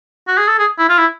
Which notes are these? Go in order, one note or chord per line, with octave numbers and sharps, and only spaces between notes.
F#4
G#4
A4
G#4
E4
F4
E4